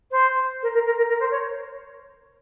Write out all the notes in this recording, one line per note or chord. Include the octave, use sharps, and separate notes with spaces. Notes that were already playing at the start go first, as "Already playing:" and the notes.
C5
A#4
A#4
A#4
A#4
A#4
C5
C#5